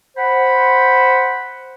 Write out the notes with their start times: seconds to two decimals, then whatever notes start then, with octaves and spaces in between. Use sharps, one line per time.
0.17 C5 F#5 B5